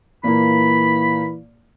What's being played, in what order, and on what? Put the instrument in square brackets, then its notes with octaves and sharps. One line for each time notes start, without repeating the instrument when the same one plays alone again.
[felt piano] A#2 A#3 [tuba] E3 [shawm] B5